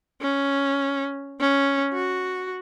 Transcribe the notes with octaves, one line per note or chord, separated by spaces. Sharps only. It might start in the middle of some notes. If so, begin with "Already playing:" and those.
C#4
C#4
F#4